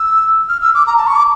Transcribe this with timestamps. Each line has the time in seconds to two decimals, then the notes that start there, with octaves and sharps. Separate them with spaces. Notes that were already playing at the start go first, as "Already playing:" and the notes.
Already playing: E6
0.49 F6
0.61 E6
0.74 D6
0.87 A#5
0.97 A5
1.07 C#6
1.16 D6